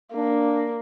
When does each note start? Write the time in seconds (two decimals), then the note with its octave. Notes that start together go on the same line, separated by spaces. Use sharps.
0.14 A#3 D4